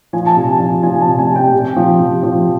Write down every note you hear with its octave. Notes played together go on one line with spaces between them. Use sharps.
F3 G#5
A5
C3 G#5
F3
F3 G#5
A5
C3
G#5
C3
G5
C3
F3
C3
F3